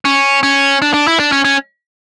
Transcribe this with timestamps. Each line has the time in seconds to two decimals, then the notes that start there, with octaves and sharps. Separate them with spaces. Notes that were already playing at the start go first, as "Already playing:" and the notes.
0.05 C#4
0.43 C#4
0.82 D4
0.94 D4
1.07 E4
1.20 D4
1.32 C#4
1.45 C#4